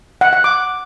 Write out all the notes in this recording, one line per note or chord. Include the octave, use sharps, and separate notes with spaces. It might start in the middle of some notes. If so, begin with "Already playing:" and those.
F#5
F#5
D6